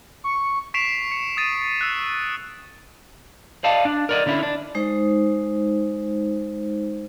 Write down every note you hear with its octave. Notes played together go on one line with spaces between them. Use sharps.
C#6
C#6 B6 C7 D7 E7 F7
C#7
D#6 A6 D#7
E6 F#6
D5 D#5 F5 A5
D4
A#4 D5 D#5
D3 C#4 D4 E4
D4
G#3 D#4 C5